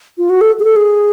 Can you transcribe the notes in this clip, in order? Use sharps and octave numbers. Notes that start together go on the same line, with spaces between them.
F4
F#4
A4
G#4
A4
G#4